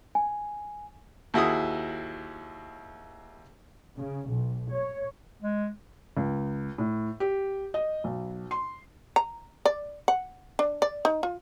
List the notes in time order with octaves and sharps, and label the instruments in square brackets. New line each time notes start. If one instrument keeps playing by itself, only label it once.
[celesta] G#5
[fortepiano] D#2 E4 F#4 G#4 D#6
[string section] C#3
B1
C#5
[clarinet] G#3
[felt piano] C#2
A2
G4
D#5
B1
C6
[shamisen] A#5
D5
F#5
D4
D5
D#4
F4